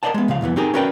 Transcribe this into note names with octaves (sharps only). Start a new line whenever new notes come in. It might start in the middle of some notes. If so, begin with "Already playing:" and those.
A#4 C5 D5 D#5 F#5 A5
G#3 B3
C#2 C#3 F3 F5
C2 F2 E3 B3
C4 D#4 G4 G#4 A#4
C#4 F#4 A#4 B4 D5 G5